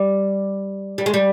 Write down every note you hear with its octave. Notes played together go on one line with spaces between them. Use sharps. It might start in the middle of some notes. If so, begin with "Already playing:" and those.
Already playing: G3
G3
G#3
G3